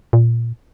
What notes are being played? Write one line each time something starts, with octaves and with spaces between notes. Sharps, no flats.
A#2